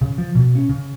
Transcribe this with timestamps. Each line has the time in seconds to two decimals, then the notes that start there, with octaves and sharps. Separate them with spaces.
0.01 C#3
0.18 F3
0.35 B2
0.55 C#4
0.69 C#3